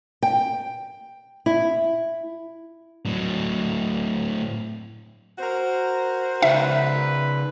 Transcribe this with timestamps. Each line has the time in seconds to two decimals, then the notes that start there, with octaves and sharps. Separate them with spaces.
0.23 G5
1.46 E4
3.05 A2 F#3
5.39 F#4 A#4 C5
6.42 C#3 D#4 B4 E5